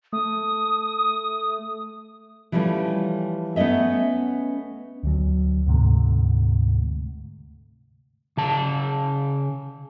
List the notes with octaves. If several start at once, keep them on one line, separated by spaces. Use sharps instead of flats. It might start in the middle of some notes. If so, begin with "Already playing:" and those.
A3 D#6
E3 F3 G3 A3 C#4
A3 B3 C#4 D#5 E5
D2 F#3
D2 G#2 C3 A3
C#3 A5